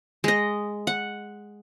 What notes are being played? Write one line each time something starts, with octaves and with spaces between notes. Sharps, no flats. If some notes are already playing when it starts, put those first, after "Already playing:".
G#3 D#5
F#5